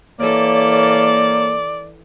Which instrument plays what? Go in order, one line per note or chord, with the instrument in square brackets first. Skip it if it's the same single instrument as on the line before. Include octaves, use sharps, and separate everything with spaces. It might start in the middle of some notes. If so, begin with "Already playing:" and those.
[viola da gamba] E3 A4 [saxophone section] A#3 [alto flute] C#5 [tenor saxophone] D5